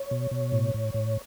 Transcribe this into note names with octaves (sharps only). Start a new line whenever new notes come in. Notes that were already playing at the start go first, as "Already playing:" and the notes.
Already playing: C#5
B2
B2
A2
A2
A2